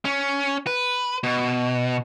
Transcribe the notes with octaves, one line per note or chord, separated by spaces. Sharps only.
C#4
B4
B2